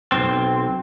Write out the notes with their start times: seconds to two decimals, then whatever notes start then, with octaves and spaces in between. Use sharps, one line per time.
0.12 B1 G#2 C4